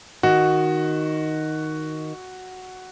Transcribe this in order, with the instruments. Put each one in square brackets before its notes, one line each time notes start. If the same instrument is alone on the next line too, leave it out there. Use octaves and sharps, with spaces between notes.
[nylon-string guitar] D#3 [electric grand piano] F#4